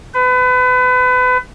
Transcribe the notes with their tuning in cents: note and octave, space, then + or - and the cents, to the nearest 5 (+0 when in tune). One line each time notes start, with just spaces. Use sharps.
B4 +30